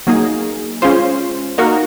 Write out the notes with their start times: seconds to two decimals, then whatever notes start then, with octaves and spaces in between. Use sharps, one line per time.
0.07 F#3 A#3 D#4 G#4
0.82 G#3 C#4 F4 C5
1.58 A#3 D#4 F#4 A#4